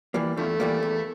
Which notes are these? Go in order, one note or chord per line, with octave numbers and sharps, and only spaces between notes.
E3 G3 A#3
E2 D3 F3 A3
E3 G3 A#3
E2